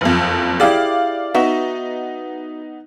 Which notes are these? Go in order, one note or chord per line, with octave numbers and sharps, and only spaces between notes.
F#1 F2
E4 G4 G#4 D5 F5
B3 D#4 F#4 E5